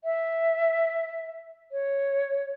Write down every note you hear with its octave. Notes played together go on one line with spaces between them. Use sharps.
E5
C#5